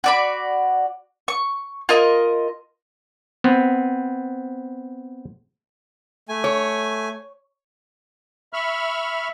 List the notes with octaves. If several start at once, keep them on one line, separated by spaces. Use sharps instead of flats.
F#4 D5 B5
C#6
F4 A#4 D#5
B3 C4
A3 G#5
C#5
E5 B5 C#6 F6